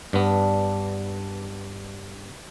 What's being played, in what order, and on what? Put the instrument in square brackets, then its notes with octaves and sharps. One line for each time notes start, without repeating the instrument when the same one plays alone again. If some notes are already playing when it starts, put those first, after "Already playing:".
[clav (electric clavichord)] G2 B3 [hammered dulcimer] D4